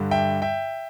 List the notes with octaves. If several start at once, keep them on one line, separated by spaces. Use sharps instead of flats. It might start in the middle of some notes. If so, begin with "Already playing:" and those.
Already playing: G2 D3 G3
E5 G5
E5 G5